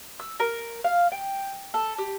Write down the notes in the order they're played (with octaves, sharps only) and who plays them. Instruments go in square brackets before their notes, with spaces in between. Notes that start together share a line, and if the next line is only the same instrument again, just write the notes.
[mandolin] E6
A#4
F5
G5
A4
G4